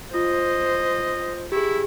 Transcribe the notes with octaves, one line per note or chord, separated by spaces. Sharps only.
F4 C5 D#5
E4 G4 G#4